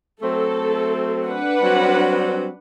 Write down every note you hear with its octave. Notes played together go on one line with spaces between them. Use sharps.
F#3 A3 C4 A4
D4 B4 F#5
F#3 G3 C4